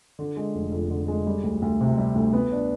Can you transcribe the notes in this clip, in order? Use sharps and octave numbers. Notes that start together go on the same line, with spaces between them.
D3
G#3
F1
F2
D3
G#3
G3
D2
D2
C3
G3
D2
B3
D4